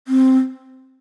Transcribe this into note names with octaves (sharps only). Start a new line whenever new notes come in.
C4